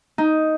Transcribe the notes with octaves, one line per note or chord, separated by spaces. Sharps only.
D#4